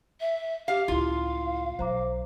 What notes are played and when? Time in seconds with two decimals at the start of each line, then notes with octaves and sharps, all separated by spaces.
0.20 E5
0.68 G4 F5
0.88 C#2 A2 E4 F4 F5 C6
1.79 B1 F#3 C5 A#5 D6